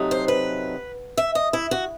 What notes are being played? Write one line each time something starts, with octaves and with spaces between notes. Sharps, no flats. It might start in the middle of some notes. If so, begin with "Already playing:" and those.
Already playing: C3 F#3 A3 D#4
C5
B4
E5
D#5
E4
F#4